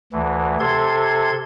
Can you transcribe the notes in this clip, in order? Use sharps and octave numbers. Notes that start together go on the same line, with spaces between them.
D2 E3
C3 A4 C6 G#6